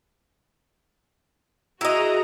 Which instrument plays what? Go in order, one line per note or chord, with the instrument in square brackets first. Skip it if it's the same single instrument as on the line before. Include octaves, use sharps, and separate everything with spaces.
[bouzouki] E4 D#5 [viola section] F#4 G#4 A#5